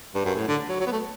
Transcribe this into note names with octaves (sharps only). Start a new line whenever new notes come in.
G2
F#2
A2
D3
F#3
F#3
B3
A3